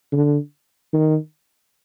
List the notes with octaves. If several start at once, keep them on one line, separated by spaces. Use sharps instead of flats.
D3
D#3